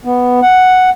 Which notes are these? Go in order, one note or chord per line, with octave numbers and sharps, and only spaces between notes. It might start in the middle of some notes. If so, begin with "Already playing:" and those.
B3
F#5